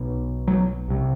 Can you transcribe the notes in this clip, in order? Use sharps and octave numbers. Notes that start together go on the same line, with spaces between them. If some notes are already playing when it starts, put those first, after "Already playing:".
Already playing: B1 B2
F#3
C2 C3